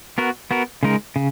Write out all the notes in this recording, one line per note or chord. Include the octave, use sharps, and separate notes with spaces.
B3 F#4 A#4
B3 F#4 A#4
C#3 G#3 D#4 A#4
C#3